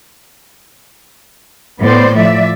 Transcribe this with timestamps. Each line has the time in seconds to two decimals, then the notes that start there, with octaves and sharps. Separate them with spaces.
1.80 A2 B3 C5 D5
2.15 F3 D5 E5